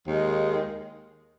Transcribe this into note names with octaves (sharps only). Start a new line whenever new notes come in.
D#2 D#3 G#3